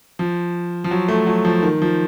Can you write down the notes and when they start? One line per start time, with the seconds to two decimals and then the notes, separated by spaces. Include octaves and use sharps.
0.19 F3
0.84 F3
0.91 F#3
1.08 A3
1.27 F#3
1.45 F3
1.63 D#3
1.82 F3